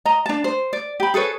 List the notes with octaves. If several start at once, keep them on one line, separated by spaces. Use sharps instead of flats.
D#5 A#5
D4 A5
C5
D5
G4 B5
G#4 A4 B4 C#5